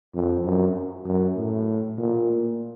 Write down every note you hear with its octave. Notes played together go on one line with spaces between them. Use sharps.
F2
F#2
F#2
A2
A#2